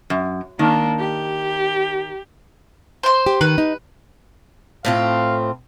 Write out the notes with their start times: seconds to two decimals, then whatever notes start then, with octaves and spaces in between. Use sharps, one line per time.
0.10 F#2
0.59 D#3 A#3 D4
0.98 G4
3.03 C5 C6
3.26 G4
3.41 D#3 B4
3.58 D#4
4.85 A2 C4 F4 F5